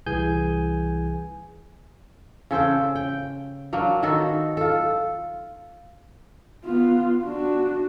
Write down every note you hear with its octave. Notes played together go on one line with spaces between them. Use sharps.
C2 E3 G#4 G#5 G6
C#3 A4 C5 G5
G5
F#3 A#3 D4
D#3 D#4 F#4 A4
F4 A4
B3 F4
D4 F#4